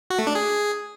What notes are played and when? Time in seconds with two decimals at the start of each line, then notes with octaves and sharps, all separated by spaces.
0.10 F#4
0.19 A3
0.27 D4
0.35 G#4